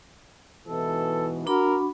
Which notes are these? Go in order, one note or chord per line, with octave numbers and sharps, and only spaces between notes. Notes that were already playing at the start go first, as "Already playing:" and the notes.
G#2 B2 E3 A4
D4 F#4 A#4 B5